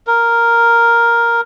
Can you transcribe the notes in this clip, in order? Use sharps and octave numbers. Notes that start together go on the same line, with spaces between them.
A#4